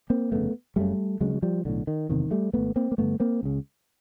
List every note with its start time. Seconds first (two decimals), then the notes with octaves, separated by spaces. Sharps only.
0.10 A#3 C4
0.31 G1 F2 C#3 A3 B3
0.76 F#1 F#2 C#3 G3 A3
1.20 D2 C#3 F#3 G#3
1.34 F#3
1.42 F3 G3
1.65 B1 A2 D3
1.87 D#3
2.09 F#1 E2 C3 D#3
2.31 G3 A3
2.53 G#1 G#2 A3 B3
2.76 A#3 C4
2.92 A#3
2.98 A1 G2 D3 A3 B3
3.20 A#3 C4
3.43 C#2 C#3